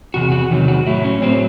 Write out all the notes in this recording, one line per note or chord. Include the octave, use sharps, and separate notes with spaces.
E2 C3 F#4
F#4
E2 C3 D#3 F#3
F#4
A2 F#3 E4
C#4
A2 F#3 C4